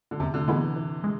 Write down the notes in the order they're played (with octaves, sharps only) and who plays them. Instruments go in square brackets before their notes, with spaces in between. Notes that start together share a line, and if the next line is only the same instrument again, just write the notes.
[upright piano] D3
[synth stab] E2 [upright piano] C3
[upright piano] D3
[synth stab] D3 G#3 B3 E4 [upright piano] E3
[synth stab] E3
G#3